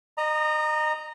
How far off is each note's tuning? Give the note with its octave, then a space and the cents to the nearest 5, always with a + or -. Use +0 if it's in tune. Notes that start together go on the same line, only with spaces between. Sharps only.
D#5 -30 A#5 +0 D#6 +0